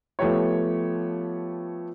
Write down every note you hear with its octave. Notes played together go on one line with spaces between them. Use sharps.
F3 A3 B3 G4 C#5